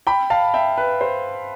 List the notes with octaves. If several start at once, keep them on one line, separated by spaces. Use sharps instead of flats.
G5 B5
F5 A5
E5 G5
B4
C5